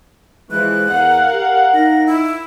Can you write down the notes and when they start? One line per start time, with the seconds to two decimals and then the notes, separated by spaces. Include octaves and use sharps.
0.51 E3 F3 G#3 F#6
0.91 E2 A#4 F5 F#5
1.33 G4
1.74 D#4 A#6
2.06 E4